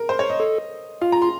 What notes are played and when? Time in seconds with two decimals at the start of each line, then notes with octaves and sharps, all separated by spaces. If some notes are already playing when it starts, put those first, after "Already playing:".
Already playing: A#4
0.09 C5
0.19 C#5
0.29 D#5
0.40 A4
1.01 F4 F5
1.12 A#5
1.22 C6